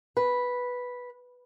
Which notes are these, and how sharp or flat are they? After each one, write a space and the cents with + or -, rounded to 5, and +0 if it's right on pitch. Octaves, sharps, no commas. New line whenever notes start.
B4 -5